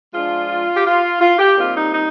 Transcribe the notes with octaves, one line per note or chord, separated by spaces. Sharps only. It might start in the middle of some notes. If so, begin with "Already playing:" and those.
F3 G#3 D4 F4
G4
F4
F4
G4
A#2 G3 C4 D#4 F4
D#4
D#4